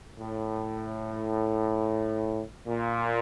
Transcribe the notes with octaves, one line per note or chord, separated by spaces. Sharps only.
A2
A#2